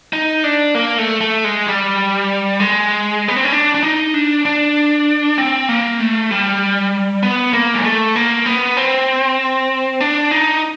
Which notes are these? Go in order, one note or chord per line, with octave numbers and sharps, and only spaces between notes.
D#4
D4
A#3
A3
A3
G#3
G3
G#3
B3
C4
C#4
D4
D4
D#4
D4
D4
C4
A#3
A3
G3
B3
A#3
G#3
A3
A#3
B3
C4
D4
D#4